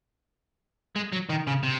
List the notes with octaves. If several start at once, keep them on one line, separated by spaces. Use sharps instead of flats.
G#3
F#3
D#3
C#3
C3